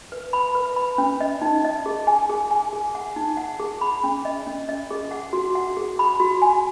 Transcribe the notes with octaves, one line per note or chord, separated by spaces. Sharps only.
B4
B5
B4
B5
C#4
D#5
D#4
D#5
G#4
G#5
G#4
G#5
G#4
F#5
D#4
F#5
G#4
B5
C#4
D#5
C#4
D#5
G#4
F#5
F#4
F#5
G#4
B5
F#4
G#5